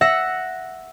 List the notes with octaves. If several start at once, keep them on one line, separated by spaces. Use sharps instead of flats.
E5 F#5 E6 A#6 C#7